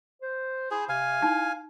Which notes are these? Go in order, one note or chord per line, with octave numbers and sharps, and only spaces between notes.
C5
E4 G#4 C5
C3 F5 G#5
D#4 E4